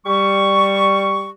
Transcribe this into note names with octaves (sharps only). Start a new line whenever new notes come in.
G3 C#6